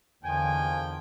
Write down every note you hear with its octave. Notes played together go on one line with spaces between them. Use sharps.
A#1 E2 D3 D#3 F3 G5 G#5